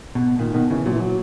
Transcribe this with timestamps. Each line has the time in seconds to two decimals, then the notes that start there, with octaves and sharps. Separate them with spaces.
0.15 B2
0.39 A#2 D#3
0.54 B2 D#3
0.70 C#3 E3
0.85 A#2 F#3
0.93 E3
1.00 F#3